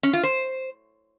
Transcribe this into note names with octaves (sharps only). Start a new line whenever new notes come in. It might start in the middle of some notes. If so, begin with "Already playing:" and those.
C#4
F4
C5